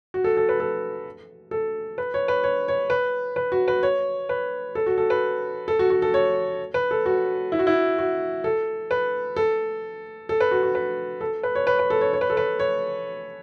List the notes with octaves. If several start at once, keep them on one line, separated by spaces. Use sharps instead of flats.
F#4
A4
A4
B4
A4
A4
B4
C#5
B4
C#5
C#5
B4
B4
F#4
B4
C#5
B4
A4
F#4
A4
B4
A4
F#4
F#4
A4
C#5
B4
A4
F#4
E4
F#4
E4
F#4
A4
B4
A4
A4
B4
F#4
F#4
B4
A4
B4
C#5
B4
B4
A4
C#5
C#5
B4
A4
B4
C#5